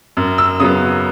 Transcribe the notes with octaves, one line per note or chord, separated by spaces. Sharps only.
F#2
E6
C#3 F#3 B3 D#6